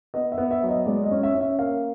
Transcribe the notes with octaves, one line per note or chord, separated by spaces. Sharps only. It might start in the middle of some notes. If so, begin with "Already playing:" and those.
B3 D#5
E5
B3
E5
F#3
D#5
G#3 D5
D#5
C#4
E5
C#4
E5
A#3 F5